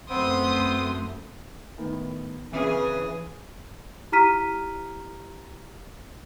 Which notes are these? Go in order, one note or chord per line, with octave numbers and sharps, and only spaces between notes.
F#2 A3 B3 C4 C6 D#6
A2 D#3 B3
C#3 E3 C4 C#4 G#4 B4
E4 G4 A#5 F6 B6 D#7